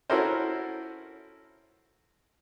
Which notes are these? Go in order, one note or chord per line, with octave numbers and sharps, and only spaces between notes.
C#4 E4 F#4 A4 A#4 C5